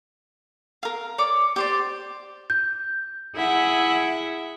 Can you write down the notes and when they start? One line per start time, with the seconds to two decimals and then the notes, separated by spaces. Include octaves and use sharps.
0.83 A#4 F5
1.18 C#5 D5 D6
1.56 G4 C5 D5
2.50 G6
3.35 E4 G#4 E5 F#5